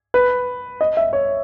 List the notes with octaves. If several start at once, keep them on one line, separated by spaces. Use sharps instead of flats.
B4
D#5
E5
C#5